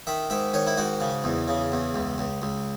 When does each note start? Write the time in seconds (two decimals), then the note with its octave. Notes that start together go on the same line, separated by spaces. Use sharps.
0.07 D#3 E5
0.30 G#2 E5
0.53 D#3 C#5
0.67 E4
0.77 G#2 F#4
1.00 C#3
1.24 E2
1.48 C#3
1.72 E2
1.94 C#2
2.18 C#2
2.42 C#2